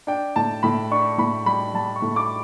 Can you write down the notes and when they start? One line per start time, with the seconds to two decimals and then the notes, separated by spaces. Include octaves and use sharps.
0.07 D4 G5
0.36 A2 A5
0.63 A2 B5
0.91 D4 C#6
1.18 A2 B5
1.46 G3 B5
1.74 G3 A5
1.96 C#6
2.02 A2
2.16 D6